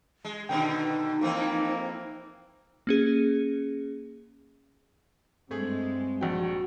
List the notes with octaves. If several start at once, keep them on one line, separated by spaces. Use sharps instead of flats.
G#3
B2 D3 D#3 D#4 G5
F2 E3 A#3 C4
A#3 C#4 G#4
G2 G#3 A3 C4 G#4
A#1 F#4 G5